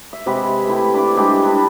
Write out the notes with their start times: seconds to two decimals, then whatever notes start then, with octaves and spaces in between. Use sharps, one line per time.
0.13 E5
0.26 C3 G#3 G4 B4
0.67 A3 E4 G4
0.94 D4 D6
1.16 G3 G#3 D4 G4
1.44 D4 B4